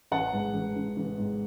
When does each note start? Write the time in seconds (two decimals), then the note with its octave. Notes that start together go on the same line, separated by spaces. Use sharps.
0.12 A1 F#5 A5
0.33 G#2
0.54 A1
0.76 A1
0.97 A1
1.18 G#2